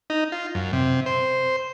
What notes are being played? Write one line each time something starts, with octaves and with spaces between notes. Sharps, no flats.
D#4
F4
F#2
C3
C5